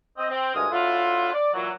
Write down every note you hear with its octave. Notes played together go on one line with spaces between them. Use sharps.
C4 D#5
C4
D2 G2 G#3 A#4 G#5 D#6
F#3 A3 D4 E4 F4
D5
A#2 E3 F#3